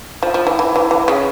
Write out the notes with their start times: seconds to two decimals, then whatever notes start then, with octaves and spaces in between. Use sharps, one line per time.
0.23 F3
0.34 F3
0.47 E3
0.59 E3
0.76 E3
0.91 E3
1.08 C#3